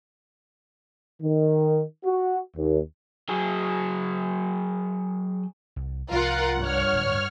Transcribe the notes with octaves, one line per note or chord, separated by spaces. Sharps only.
D#3
F#4
D#2
F#3 G#4
C2
C2 F3 F4 A#4 F#5
G2 C#5 F6
D1